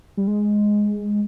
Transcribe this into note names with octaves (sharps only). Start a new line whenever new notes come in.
G3
G#3